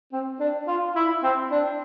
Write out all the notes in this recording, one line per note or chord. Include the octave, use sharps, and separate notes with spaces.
C4
D4
F4
E4
C4
D4